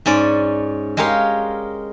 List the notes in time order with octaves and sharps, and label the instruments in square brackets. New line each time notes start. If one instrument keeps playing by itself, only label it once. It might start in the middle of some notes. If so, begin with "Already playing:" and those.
[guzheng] G#2 C#4 D5
G#3 G4 A#4 C#5 F5